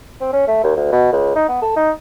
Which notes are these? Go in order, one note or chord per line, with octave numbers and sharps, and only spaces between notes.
C4
C#4
A3
D#2
D2
B2
C#2
D#4
B3
A4
D#4